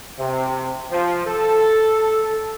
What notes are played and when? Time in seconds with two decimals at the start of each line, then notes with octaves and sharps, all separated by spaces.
0.19 C3
0.91 F3
1.27 A4